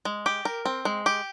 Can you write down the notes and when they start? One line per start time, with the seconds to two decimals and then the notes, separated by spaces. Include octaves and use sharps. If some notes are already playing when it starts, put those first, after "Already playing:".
0.05 G#3
0.26 G4
0.45 A#4
0.65 C4
0.85 G#3
1.06 G4